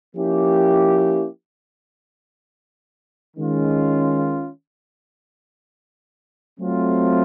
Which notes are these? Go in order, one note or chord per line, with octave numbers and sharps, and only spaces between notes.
F3 A#3 C#4 E4 G4
D#3 G#3 C#4 F4
F#3 A3 C4 F4